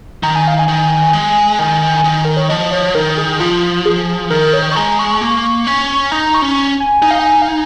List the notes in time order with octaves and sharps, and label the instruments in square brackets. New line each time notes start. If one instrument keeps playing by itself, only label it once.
[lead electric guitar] D#3 [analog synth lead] A#5
[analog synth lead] G#5
F5
G#5
[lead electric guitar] D#3
G#3
D#3
D#3
[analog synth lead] A#4
C#5
[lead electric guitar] F3 [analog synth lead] D#5
[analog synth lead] C#5
[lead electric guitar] D#3 [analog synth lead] A#4
[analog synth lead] G#4
G#4
[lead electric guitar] F3 [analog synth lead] F4
[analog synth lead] G#4
[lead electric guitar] D#3 [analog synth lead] A#4
[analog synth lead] C#5
C#6
[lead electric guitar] G#3 [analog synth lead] A#5
[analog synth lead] C#6
[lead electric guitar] A#3
C#4
[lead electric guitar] D#4 [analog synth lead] A#5
[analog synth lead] C#6
[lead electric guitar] C#4
[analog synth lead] G#5
[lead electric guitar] D#4 [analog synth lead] G#5
[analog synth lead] F5
G#5
F5
G#5